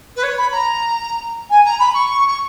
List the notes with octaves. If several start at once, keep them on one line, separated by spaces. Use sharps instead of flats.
B4
C#5
B5
A#5
G#5
A#5
B5
C#6
C#6